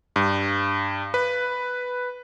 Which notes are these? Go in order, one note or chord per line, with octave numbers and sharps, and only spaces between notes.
G2
B4